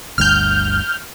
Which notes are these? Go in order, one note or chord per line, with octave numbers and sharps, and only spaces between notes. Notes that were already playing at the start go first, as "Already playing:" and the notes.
G1 D2 G2 F6 G6